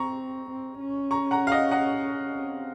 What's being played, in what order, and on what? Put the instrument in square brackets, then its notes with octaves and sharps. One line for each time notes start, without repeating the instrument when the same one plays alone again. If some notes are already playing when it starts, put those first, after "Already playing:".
Already playing: [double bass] C4 [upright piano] A#5 C#6
[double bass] C4
C#4
[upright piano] A#5 C#6
F#5 A#5
F5
D#5 F#5
D#5 F#5
[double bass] C4